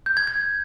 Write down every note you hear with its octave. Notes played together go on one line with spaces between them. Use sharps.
G6
G#6
G#6